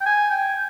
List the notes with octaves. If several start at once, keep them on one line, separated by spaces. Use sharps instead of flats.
G5
G#5
G5